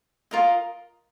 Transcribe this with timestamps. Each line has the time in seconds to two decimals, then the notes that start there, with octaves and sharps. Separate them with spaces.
0.31 F4 A#4 D#5